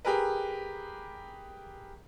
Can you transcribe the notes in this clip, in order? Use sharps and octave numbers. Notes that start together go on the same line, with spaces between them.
G4 G#4 A#4 B4